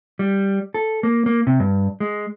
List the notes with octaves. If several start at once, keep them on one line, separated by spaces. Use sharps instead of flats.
G3
A4
A#3
A#3
C3
G2
G#3